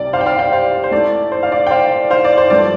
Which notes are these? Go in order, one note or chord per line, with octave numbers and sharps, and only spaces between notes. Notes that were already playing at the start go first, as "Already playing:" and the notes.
Already playing: C2 C3 G3 D5
C5 F5
G5
C5 F5
D5 G5
C5 F5
C5
A2 A3 D5
C5
F5
D5
G5
C5 F5
C5 F5
D5
C5
G2 F3 A3 D5